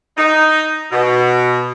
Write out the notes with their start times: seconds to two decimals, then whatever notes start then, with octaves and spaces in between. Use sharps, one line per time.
0.17 D#4
0.91 B2